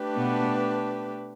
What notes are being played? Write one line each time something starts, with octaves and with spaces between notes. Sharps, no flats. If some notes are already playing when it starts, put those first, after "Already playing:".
Already playing: A3 D4 G4 B4
B2 B3